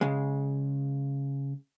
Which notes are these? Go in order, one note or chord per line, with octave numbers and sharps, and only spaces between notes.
C#3 G#3